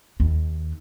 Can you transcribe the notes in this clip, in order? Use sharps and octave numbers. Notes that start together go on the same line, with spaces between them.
D#2